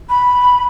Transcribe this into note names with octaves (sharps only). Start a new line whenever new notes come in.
B5